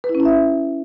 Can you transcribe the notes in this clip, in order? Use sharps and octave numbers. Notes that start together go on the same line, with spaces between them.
B4
E4
C#4
E4
E5